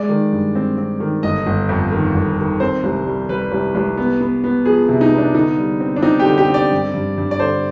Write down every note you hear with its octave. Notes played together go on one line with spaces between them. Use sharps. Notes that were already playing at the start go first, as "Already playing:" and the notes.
Already playing: G#3 D5
D#3
G2
C4
C4
D#3
G1 D#5
G1
F2
D#3
G1
D#3
C4 C5
C2
G3
G3 B4
C2
C2
B3
B3
B3
F3 G#4
C3
D#4
B3
D4
D3 D#4
G3
C4
D4
C4 D#4
G4
D3
G4
C4
D5
G2
G2
G2
D5
D3 C5